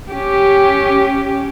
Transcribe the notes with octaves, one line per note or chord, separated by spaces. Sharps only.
C#4 G4